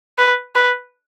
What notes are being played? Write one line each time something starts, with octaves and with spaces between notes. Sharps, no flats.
B4
B4